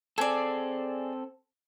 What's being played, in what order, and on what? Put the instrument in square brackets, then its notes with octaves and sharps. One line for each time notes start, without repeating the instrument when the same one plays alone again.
[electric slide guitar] C4 A4 [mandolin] G#4 D5